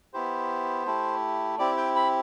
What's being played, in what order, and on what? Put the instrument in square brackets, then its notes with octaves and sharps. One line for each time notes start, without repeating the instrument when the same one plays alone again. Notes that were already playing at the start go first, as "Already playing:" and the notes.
[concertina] B3 E4 G4 C5
A3 E4 G4
C4 E4 G4 D5
G5
B5